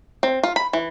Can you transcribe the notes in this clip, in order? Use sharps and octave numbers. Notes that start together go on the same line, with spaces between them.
C4
F4
B5
E3